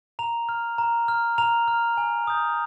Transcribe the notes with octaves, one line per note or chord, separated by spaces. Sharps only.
A#5 F7
F6
A#5
F6
A#5 F7
F6
G#5
D#6 G6